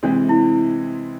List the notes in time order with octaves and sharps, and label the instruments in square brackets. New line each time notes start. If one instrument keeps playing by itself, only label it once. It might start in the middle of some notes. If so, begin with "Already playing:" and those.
[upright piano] C3 E3 G#3 C4 [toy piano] D4
[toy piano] E4